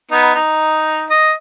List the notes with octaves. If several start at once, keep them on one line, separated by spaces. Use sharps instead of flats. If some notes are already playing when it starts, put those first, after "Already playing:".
B3 D#4
D#4
D#5